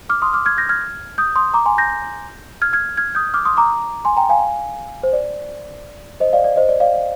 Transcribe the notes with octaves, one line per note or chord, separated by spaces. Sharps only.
D6 F6
C6 D#6
D6 F6
F6 G#6
G6 A#6
F6 G#6
D#6 G6
C6 D#6
A#5 D6
G#5 C6
G6 A#6
F6 G#6
F6 G#6
F6 G#6
D#6 G6
D6 F6
C6 D#6
A#5 D6
G#5 C6
G5 A#5
F5 G#5
C5
D5
C5 D#5
D5 F5
D5
C5 D#5
D5
D5 F5